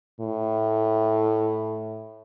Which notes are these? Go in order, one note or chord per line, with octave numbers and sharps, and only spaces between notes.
A2